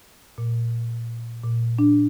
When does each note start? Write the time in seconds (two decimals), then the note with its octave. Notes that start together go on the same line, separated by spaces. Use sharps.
0.38 A#2
1.44 A#2
1.79 D4